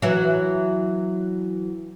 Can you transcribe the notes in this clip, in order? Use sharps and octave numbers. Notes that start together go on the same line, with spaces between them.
E3 F#3